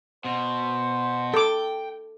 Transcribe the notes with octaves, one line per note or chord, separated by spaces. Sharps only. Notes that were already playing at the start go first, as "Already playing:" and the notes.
B2 C5
A4 G5 D6